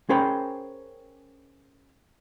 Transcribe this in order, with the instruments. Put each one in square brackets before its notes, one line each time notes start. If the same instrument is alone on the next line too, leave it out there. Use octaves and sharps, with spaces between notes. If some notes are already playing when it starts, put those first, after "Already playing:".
[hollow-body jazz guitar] C#4 G#4 A#4 C5 G5 B5